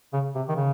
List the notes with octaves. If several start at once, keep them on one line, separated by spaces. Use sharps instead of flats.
C#3
C3
D#3
C#3